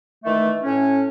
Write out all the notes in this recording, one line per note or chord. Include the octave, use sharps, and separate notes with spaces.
D#3 E3 A3
A2 C#4